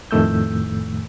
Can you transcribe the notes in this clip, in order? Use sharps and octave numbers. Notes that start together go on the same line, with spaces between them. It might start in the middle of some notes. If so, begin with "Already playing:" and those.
F2 A2 D#3 A3 E6 G6